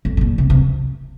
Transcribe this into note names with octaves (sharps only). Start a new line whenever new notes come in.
F2
A2
A#2
C3
C3